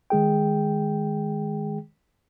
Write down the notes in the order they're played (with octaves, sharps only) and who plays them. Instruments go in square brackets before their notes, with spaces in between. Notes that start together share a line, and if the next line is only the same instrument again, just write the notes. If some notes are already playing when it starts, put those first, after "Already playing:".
[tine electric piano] D#3 G#3 G#4 G5